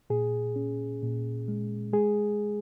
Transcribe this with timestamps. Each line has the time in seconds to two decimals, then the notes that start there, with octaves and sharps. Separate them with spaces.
0.10 A#2 G#4
0.56 C#4
1.02 A#2
1.48 G#3
1.93 G#3 G#4